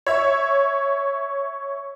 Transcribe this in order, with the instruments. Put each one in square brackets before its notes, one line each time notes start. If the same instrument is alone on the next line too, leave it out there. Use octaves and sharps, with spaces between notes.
[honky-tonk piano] C#5 E5